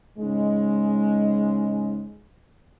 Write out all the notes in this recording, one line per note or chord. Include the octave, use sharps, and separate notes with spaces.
G#2 C#3 G#3